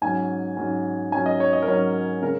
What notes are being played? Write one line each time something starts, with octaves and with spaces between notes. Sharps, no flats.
G#2 F#3 C#4 G#5
G#2 F#3 C#4
G#2 F#3 C#4 G#5
D#5
C#5
D#5
A#4
G#2 F#3 C#4 C#5
C#3 G#3 C#4 A#4